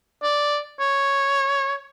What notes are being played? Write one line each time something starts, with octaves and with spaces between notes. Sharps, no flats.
D5
C#5